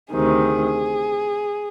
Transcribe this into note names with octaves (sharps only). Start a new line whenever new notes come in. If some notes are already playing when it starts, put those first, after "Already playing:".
D2 C3 D#3 G#4